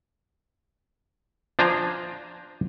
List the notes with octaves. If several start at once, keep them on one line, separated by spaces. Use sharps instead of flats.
F3 D4 F4 C5 G#5 A#5